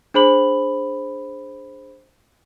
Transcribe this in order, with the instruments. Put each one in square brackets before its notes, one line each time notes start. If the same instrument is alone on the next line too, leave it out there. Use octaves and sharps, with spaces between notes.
[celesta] D4 G#4 C5 B5 F#7